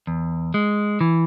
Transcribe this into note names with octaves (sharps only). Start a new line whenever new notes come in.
E2
G#3
E3